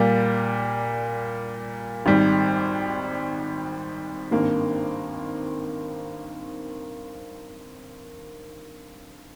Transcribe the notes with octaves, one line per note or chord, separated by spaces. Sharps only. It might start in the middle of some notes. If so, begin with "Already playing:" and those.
Already playing: A#2 G3 A#3
G#1 G#2 G3
G#1 G2 D#3 A#3